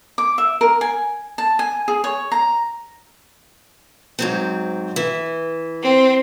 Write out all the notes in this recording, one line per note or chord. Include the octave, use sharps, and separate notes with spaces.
D6
E5
A#4
G#5
A5
G#5
G#4
C#5
A#5
G#2 F#3 C4
E3
C4